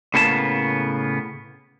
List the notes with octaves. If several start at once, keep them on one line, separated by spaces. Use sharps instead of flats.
A2 C#3 A#3 B3 A5